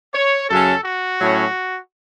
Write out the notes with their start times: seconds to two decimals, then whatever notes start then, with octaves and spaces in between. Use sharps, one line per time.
0.15 C#5
0.50 F#2 C#3 F#3 C#4 A4
0.84 F#4
1.21 A2 F#3 C#4